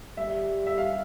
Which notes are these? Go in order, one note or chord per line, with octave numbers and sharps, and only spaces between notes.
G3 E5
E5
F5